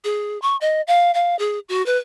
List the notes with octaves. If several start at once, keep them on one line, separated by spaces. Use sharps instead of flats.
G#4
C#6
D#5
F5
F5
G#4
F#4
B4